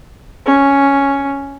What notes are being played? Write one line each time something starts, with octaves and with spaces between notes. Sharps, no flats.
C#4